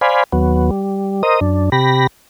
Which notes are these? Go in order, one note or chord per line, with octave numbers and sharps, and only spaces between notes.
C5 D5 F5 G#5 B5
D#2 F#3 B3
G3
A#4 C5 D#5 D#6
F#2 D4
C3 G4 B5 A#6